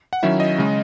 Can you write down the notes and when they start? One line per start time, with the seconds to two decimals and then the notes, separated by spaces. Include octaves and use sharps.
0.13 F#5
0.23 D#3 F#3 C#4 E4 E5
0.40 D#5
0.58 C#3 G#3